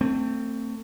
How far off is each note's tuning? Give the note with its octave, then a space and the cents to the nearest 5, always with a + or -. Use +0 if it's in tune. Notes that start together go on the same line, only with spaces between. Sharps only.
A3 +30 C4 +0